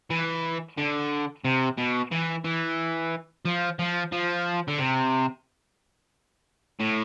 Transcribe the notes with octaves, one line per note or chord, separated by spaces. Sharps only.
E3
D3
C3
B2
E3
E3
F3
F3
F3
D3
C3
A2